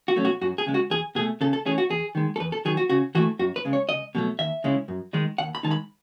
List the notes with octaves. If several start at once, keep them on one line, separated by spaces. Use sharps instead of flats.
F#4
B2 F#3 A3 C#4
F#4
F#2 F#4
G#4
C#3 G#3
F#4
E2 G#4
B2 A3 G#4
C#3 A4
A4
E3 A3 C#4 G#4
F#4
E2 G#4
D#3 G#3
A4
E2 B4
A4
D#3 F#3 G#4
F#4
C#3 F#4
E3 A3 F#4
F#2 F#4
B4
C#3 G#3
C#5
C#2 D#5
B2 F#3 A3
D#2 E5
C#3 G#3 C#4 E4
F#2
D#3 G#3 D#4
D#2 F#5
B5
D#3 G#3 D#4 A5
B5